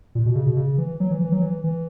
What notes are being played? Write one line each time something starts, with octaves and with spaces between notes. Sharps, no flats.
A#2
B2
C#3
B2
C#3
E3
F#3
E3
E3
F#3
E3
E3